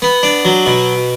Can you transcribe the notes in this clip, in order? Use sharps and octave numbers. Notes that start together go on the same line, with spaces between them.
B3
D4
F#3
B2